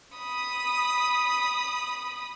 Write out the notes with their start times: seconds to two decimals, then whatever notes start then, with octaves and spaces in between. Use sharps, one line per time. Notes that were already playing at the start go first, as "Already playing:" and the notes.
0.17 B5 D#6